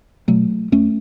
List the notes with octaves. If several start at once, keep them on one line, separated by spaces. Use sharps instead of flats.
B2 F#3 A3
E2 A3 C#4